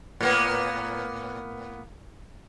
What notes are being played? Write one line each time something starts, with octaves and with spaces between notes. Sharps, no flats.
A2 A#3 B3